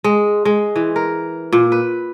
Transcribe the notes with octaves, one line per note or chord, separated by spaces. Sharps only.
G#3
G#3
E3
A#4
A#2
B4